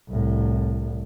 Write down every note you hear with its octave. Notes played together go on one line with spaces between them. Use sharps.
C2 A2